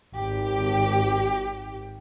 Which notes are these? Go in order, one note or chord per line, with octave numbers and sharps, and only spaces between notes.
G#1 G4